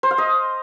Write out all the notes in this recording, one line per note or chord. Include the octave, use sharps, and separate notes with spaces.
C5
F5
D#5